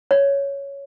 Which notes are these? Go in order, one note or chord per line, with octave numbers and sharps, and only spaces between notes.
C#5